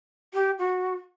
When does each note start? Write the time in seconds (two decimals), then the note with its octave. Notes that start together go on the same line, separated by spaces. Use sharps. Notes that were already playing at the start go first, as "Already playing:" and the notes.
0.34 G4
0.59 F#4